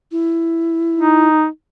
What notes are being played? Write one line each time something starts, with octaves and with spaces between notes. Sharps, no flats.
E4
D#4